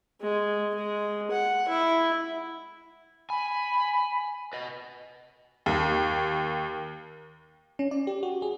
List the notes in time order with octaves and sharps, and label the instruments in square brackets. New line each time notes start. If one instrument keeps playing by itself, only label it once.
[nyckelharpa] G#3
G#3
F#5
E4
[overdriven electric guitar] G#5 [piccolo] B5
[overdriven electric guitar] B4 D#5
[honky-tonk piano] D#2
[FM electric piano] C#4
D5
G4
F#4
G#4